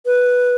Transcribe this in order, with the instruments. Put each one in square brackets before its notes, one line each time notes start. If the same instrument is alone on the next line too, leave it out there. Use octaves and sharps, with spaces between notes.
[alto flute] B4